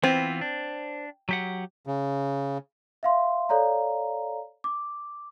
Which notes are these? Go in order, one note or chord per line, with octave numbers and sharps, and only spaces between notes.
E3 B3 C4 F4
D4
F#3 G4 F#5
C#3
E5 F5 C6
A4 C#5 D5 F5 A#5
D6